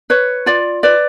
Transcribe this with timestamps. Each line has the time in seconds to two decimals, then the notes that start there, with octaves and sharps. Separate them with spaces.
0.10 B4 C#5
0.46 F4 D5
0.83 B4 D5